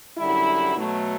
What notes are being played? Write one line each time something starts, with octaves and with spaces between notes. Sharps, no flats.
F#2 D3 G3 E4
B2 F#3 A3